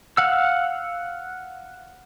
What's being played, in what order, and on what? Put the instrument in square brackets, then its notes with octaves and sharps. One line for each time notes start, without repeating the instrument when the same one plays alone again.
[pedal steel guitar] F5 F#5 E6